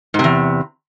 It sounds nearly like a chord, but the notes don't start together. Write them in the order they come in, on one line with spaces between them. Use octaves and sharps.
G#2 C3 E2